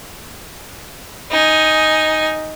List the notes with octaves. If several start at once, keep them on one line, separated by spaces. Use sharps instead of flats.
D#4 G#5